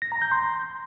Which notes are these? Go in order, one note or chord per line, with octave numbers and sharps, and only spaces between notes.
A#6
A#5
G6
C6